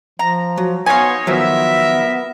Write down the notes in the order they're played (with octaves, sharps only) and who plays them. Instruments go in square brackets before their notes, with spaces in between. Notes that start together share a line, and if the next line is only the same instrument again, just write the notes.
[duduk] F3 [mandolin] A#5
[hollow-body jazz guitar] F#3
[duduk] B3 [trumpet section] D#4 C#5 [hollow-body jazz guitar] B4 F5 [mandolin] G#5 C6
[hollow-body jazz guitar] D#3 F3 F#3 [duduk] B3 [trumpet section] A#4 E5